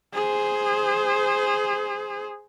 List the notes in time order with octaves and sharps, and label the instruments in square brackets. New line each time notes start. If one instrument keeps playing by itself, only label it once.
[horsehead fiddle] G#4 C5